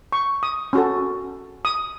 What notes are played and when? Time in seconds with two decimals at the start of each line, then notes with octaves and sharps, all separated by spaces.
0.12 C#6
0.43 D#6
0.73 C#4 F#4 A4
1.65 D#6